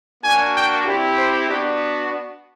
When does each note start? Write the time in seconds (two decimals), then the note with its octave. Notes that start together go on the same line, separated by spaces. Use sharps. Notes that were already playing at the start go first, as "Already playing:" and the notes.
0.23 A#3 D4 F#4 G#5
0.54 G5
0.85 C4 E4 G4
1.16 C5
1.48 B3 D4 F#4 G4